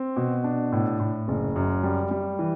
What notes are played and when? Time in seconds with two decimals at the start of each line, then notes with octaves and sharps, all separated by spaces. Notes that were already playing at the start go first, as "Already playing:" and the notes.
Already playing: C4
0.17 B2
0.44 D4
0.72 A2
1.00 A2
1.28 F#1
1.56 F#2
1.83 G3
2.11 G3
2.39 E3